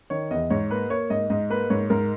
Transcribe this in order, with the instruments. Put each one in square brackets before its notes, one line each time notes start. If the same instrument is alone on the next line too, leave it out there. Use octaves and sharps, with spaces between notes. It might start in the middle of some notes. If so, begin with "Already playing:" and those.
[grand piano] D#3 C#5
E2 D#5
G#2 C#5
A#3 B4
A#3 C#5
G#2 D#5
G#2 D#5
A#3 B4
G#2 C#5
G#2 A#4